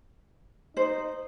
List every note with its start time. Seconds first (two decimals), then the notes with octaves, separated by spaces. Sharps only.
0.77 D#4 C5